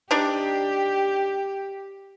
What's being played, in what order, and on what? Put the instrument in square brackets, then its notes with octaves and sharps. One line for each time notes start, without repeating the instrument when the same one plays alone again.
[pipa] D4 D#4 [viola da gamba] G4